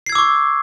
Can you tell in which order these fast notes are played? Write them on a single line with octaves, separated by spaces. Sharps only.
C7 G#6 E6 D6 C#6